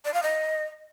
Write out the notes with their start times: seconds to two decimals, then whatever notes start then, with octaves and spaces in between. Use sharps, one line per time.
0.05 D5
0.14 F5
0.23 D#5